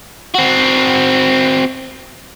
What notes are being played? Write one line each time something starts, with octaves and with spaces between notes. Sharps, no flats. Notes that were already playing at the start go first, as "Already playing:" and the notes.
C4 F#4